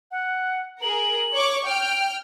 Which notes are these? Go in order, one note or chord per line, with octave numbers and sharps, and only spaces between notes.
F#5
G#4 A#4 F#7
C#5 C#6 D6
G5 F6 D7